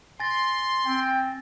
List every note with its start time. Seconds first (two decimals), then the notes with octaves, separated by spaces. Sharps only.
0.20 G#5 C6 A6 A#6
0.86 C4 G5